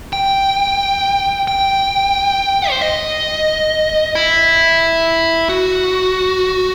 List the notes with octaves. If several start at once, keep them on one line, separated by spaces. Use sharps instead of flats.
G5
G5
C5
D#5
E4
F#4